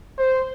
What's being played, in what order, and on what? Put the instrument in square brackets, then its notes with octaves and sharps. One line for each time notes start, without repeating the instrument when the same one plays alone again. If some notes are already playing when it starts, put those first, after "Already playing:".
[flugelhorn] C5